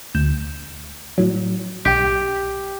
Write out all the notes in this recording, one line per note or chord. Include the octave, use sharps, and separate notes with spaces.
D2 G6 E7
A2 F#3
B1 G4 G5